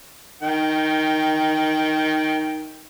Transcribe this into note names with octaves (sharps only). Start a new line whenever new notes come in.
D#3 G5